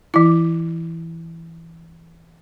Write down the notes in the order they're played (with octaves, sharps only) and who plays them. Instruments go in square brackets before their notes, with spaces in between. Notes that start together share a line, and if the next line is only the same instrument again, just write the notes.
[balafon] E3 E4